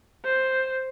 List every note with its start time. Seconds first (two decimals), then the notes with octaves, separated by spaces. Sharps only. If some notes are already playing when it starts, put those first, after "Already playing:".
0.25 C5